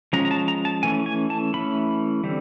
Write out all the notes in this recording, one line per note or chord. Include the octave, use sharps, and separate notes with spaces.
F3 G#3 C#4 A#5
A#5
A5
A#5
A5
E3 A3 C#4 G#5
G#5
A5
E3 A3 C#4 B5
D3 G3 C4